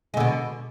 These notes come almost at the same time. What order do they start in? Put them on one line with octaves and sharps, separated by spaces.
G#3 D3 B2